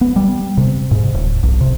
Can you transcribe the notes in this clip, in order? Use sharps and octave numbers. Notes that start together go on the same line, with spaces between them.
B3
G3
C3
G#2
D1
B1
C3